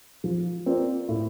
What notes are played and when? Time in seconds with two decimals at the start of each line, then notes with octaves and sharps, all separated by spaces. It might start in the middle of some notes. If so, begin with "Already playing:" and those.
0.24 F3
0.66 C4 F4 A#4 D5
1.09 A2